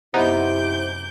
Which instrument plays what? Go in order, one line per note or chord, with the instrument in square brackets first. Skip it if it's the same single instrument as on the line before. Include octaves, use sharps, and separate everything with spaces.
[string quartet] F#2 D6 G6 [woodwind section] C3 [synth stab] B3 D#4 [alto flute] E4